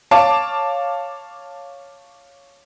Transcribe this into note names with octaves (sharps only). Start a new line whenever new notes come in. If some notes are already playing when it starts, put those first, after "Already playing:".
C#5 F5 A5 D6